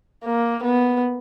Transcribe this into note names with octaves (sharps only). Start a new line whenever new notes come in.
A#3
B3